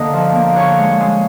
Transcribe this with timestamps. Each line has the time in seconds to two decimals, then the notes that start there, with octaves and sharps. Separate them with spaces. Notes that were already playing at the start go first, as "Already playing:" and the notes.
Already playing: D3 A#3 D#5 D#6
0.13 F3
0.35 A#3
0.54 D3 C#5 C#6
0.78 G#3
1.00 G#3